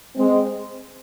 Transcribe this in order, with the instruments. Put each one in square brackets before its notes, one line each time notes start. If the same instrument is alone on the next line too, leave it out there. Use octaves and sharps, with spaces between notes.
[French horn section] G#3 C4